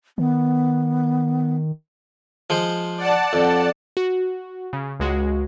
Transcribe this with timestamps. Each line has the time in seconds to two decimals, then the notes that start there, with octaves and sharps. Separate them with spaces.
0.18 D#3 B3
2.50 F3 G#3 C5
2.98 D5 F#5 A5
3.33 F2
3.97 F#4
4.73 C#3
5.00 C#2 G#3 F#4